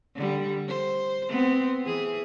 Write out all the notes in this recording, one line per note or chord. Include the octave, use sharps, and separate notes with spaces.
D3 G3
C5
B3 C4
E3 G#4